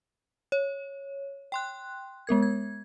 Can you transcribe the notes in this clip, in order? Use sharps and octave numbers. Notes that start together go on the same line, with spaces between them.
C#5
G5 C6 F#6
G#3 B3 A#4 G#6
G#6